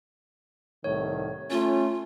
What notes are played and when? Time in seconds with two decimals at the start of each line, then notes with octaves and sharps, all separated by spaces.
0.84 C2 A2 D#3 C#5
1.50 A3 C#4 F4